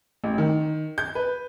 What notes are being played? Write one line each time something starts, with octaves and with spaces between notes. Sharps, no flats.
A1
D#3
G6
B4